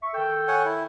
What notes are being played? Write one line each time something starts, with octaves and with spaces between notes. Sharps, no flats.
E5 C#6
D#3 A4 G5
C#5 F#5 G#5
E4